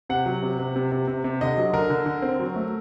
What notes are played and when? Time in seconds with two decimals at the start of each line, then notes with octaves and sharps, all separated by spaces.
0.09 C3 F#5
0.26 F#3
0.43 C3
0.59 C3
0.76 C3
0.92 C3
1.08 C3
1.24 C3
1.41 D3 D#5
1.58 F#3
1.73 D3 A#4
1.90 D3
2.06 D3
2.22 C4
2.40 F#3
2.56 A3